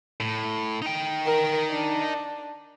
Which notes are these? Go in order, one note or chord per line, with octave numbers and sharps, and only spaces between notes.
A2
D#4 G5
A#4
D4